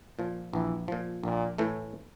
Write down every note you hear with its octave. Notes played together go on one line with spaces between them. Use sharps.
A#2 F3
A#1 E3
A#2 F3
A#1 A#2
A2 E3 A3